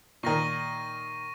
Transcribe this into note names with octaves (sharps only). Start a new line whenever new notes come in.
A#2 D#3 C#6 A#6 D#7